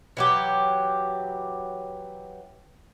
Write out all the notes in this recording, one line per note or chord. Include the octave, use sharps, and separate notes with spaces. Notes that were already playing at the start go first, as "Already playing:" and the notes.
E3 F#3 G4